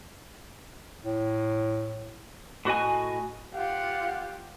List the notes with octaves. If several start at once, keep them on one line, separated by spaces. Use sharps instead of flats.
A2
A2 F#4 D#5 G#5
F4 G4 F#5